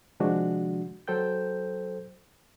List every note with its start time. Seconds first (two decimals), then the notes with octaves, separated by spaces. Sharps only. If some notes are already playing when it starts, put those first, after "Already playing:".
0.20 C3 D#3 F3 G#3 D4 F#4
1.08 F#3 A4 C5 G5 G6